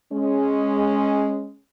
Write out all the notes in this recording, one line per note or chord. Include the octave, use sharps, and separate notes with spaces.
G#3 C#4